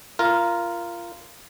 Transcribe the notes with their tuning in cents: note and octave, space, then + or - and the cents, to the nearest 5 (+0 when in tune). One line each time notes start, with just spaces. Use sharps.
F4 -20 A#4 +0